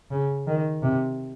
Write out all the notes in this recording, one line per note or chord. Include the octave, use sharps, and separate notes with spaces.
C#3
D#3
C3